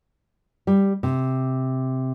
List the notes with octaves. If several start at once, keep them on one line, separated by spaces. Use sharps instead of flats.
G3
C3